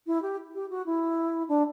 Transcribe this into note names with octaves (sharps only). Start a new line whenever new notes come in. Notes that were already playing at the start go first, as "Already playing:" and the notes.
E4
G4
G4
F#4
E4
D4